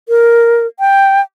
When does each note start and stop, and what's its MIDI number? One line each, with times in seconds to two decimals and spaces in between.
0.09 0.67 70
0.80 1.21 79